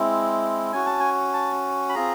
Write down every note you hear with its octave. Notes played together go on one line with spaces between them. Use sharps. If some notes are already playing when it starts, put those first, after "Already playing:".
Already playing: G#3 C4 E4
C#4 F#4 G#5
A5
G#5
A5
B5
C4 F4 G#4 A#5